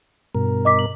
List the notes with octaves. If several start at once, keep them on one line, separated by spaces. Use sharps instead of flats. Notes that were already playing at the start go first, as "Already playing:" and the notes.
G2 B2 A#4
D#5 D6 B6
F#7